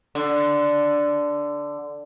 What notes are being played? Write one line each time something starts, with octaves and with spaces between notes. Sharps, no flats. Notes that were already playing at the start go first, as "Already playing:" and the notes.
D3